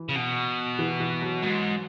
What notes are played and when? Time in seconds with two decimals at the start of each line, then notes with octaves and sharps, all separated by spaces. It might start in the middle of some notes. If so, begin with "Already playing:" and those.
Already playing: E3
0.09 C#3
0.16 B2
0.79 E3
1.00 E3
1.22 F#3
1.42 G#2 F#3